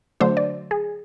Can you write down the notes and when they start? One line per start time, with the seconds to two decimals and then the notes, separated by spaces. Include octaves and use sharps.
0.20 D3 F#3 A3 D4 C5
0.37 D5
0.71 G#4